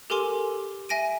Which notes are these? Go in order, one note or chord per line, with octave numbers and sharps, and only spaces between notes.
G4 A4 A#4 G#5 C6 D6
E5 G#5 A#6 D7 D#7